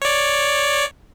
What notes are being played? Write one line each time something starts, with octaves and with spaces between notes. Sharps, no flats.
C#5 D5